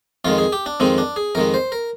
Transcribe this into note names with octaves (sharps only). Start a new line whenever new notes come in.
F2 D#3 G#3 F4
G#4
G4
D4
F2 D#3 G#3 C4
D4
G#4
F2 D#3 G#3 A#4
C5
A#4